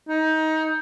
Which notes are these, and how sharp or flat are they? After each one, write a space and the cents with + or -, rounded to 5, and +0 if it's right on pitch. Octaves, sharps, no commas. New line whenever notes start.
D#4 +20